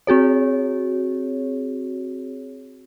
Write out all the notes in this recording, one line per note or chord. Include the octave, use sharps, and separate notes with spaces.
C4 F#4 G#4 C#5